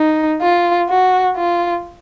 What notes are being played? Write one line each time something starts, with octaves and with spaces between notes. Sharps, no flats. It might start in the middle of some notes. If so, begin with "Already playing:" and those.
Already playing: D#4
F4
F#4
F4